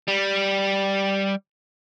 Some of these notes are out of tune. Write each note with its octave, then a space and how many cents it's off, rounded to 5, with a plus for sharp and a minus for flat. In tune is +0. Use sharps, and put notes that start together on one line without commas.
G3 +0